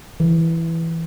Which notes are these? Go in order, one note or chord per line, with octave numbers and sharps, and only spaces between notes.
E3